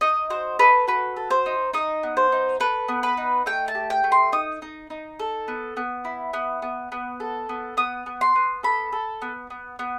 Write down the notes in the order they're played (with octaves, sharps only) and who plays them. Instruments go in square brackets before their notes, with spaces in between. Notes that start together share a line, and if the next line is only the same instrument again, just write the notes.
[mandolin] D#4 D#5
F#4 C5
A4 B4
F#4 B4
A4
C5
D#4
D#4 D#5
B3
C5
D#4
A4 B4
B3
B4
D#4
A3 G5
A5
G4
G5
A3
C6
D#4 D#6
D#4
D#4
A4
B3
B3
E4
B3
B3
B3
A4
B3
B3 D#6
B3
C6
B3
A4 B5
A4
B3
B3
B3